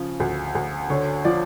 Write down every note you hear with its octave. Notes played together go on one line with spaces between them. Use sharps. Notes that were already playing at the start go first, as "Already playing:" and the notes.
Already playing: C#3 F3
D2
D2
D3 C#5
F3 D5